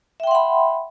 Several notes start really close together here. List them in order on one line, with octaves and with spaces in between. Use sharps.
E5 G5 C6 F#5 B5